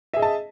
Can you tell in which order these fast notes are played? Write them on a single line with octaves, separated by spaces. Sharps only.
E5 G#4 D#5 A5